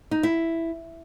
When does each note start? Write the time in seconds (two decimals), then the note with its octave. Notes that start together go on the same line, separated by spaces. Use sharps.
0.11 D#4
0.23 E4